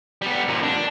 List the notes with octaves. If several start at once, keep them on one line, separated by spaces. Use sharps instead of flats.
G3 B3
F2 A#2
D4